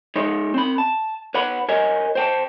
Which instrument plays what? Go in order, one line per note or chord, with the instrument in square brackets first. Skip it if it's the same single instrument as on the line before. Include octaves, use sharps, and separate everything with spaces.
[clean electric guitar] G#3 D#4 C#5
C4 B5
A5
B4 C#5 F#5 B5
A#4 C#5 D#5 G#5
C5 G5 A5